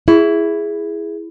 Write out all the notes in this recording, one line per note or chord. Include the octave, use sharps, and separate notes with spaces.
E4 G#4